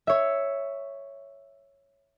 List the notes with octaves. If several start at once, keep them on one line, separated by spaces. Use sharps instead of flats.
C#5 E5